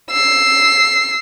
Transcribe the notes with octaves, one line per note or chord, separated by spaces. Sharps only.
E6 C7